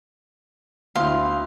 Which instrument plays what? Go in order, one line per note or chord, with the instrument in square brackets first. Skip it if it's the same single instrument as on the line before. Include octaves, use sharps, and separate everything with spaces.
[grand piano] D2 E4 [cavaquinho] F5 C6